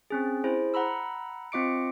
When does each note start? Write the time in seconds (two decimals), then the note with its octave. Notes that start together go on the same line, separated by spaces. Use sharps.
0.10 C4 C#4 G#4
0.44 E4 G#4 C5
0.74 F#5 A#5 B5 E6
1.52 C4 F4 D#5 D6 C#7 D7